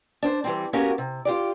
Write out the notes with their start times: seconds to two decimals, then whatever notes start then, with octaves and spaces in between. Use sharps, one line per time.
0.22 D4 C5
0.44 E3 G3 C4
0.73 A#3 B3 C#4 F#4 G4 A#4
0.98 C3
1.25 F4 G4 D5